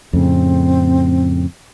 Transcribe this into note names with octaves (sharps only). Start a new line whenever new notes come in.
F2 A2 C#3 C4